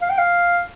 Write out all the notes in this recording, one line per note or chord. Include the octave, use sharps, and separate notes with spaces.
F5
G5
F5